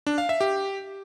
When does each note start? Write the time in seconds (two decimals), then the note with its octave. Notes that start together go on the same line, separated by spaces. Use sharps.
0.07 D4
0.18 F5
0.29 E5
0.41 G4